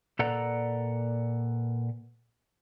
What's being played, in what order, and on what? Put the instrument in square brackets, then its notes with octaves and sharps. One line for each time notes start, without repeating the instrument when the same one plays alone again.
[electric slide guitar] A#2 A4 B4 D5 F#5 A#5